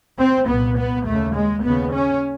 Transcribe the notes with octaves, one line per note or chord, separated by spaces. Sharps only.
C4
C2 A#2 B3
B3
D#2 C#3 A3
G#3
D#2 C#3 B3
C#4